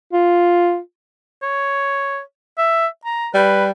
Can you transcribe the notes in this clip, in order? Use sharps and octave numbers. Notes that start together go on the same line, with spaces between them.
F4
C#5
E5
A#5
G3 B4